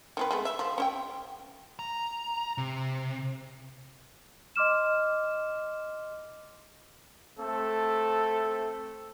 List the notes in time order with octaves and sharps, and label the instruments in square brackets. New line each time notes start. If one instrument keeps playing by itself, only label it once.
[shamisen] D#3 C4 B4
G#3 A3 B3
E5
F3 C5
C#4 C5 G5
[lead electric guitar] A#5
C3
[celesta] D#5 C6 D6 F6 E7
[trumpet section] A3 C4 A4